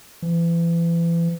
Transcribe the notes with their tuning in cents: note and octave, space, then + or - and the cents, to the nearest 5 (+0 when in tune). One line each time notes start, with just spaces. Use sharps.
E3 +35